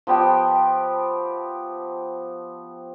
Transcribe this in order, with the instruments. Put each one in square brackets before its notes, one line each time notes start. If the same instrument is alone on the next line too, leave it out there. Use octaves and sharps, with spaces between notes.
[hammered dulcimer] F3 B3 G4 G5